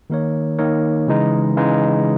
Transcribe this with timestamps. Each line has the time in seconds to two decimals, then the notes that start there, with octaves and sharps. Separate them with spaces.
0.10 D#3 A#3 D#4 A#4 C#5
0.58 D#3 A#3 D#4 A#4 C#5
1.08 C#3 E3 G#3 D#4
1.57 C#3 E3 G#3 D#4